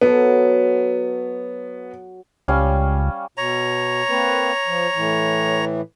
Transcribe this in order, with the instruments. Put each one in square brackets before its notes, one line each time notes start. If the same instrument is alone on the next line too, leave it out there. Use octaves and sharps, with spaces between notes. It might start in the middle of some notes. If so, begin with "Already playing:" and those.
[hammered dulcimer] F#3 A4 [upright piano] B3
[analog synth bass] C#2 [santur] G3 C#4 F5
[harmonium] B2 [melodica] C#5 A#5
[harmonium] A#3 C4 B4
F3
A2 E3